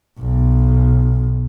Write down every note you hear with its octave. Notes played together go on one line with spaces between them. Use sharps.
B1